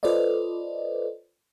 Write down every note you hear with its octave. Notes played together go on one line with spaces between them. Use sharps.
F4 A4 B4 C5 D5 D#5